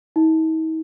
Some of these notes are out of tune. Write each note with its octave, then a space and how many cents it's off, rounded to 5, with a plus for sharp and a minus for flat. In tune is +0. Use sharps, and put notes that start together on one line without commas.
D#4 +45